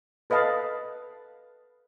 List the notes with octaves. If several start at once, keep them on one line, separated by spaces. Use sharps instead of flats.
A4 B4 D#5 F5 A5